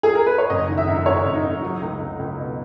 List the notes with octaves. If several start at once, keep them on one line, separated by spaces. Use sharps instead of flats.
G#4
A#4
B4
C#5
F#1 D#5
D#3
E5
F#2
F#1 C#5
F#1
D#4
F#1
F#3
C#2
C#2
C#2
B2